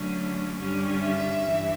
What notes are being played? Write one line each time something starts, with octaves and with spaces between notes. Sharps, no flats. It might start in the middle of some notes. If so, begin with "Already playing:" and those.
Already playing: D3 F#3 A3 C#4
G2 D3 G3 C#4
E5
G2 E3